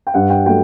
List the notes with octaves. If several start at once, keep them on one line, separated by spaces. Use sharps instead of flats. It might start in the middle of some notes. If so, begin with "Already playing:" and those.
G5
G2 F#5
G5
F#3 A3 G5